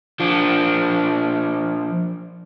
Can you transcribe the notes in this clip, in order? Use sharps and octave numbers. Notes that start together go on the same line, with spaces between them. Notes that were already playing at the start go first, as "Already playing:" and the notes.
F3 D4